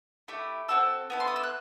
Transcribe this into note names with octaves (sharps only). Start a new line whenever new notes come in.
A3 E4 G4
C4 F#4 A4 E6
B3 E4 A4
C6
D#6
E6
F#6